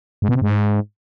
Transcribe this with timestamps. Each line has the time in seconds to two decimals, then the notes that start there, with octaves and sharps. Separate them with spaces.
0.22 G#2
0.29 B2
0.35 C3
0.42 G#2